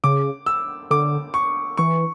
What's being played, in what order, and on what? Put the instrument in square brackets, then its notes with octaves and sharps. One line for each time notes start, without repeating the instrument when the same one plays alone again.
[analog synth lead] C#3 [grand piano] D6
[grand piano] E6
[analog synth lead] D3 [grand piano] D6
[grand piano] C#6
[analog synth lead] E3 [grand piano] C#6